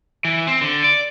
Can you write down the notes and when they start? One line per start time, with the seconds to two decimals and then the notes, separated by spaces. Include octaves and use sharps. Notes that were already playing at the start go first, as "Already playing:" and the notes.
0.25 E3
0.47 C4
0.61 D3
0.84 D5